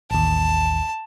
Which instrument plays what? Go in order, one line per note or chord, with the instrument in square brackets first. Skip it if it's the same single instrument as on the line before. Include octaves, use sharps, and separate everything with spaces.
[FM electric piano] A1 D#2 [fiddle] A5